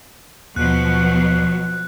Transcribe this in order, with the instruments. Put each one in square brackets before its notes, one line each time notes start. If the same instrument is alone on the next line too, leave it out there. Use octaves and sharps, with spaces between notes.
[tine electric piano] D#2 [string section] B2 F3 F#3 [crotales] F#6